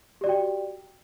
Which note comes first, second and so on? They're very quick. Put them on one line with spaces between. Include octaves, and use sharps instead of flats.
G4 D5 F#4 G5